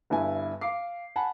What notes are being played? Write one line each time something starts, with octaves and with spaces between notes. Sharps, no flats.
G1 G2 E4 G#5
F5 D6 C7
F#5 G#5 A5 B5